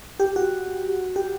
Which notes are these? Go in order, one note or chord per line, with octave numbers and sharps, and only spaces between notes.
G4
F#4
G4